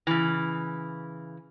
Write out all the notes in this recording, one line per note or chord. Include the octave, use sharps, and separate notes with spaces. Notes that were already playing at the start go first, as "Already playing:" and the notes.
C#3 E3